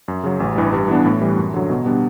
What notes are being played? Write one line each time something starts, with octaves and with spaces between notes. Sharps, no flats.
F#2
C#3 F#3
A1
G2 E3 G3
G2
E3 B3 D4
A2
E3 G3
F#2
D3 F#3
B2
G3 B3 D4